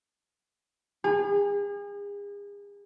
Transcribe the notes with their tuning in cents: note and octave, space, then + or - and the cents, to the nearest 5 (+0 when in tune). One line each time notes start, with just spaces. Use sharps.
G#4 -40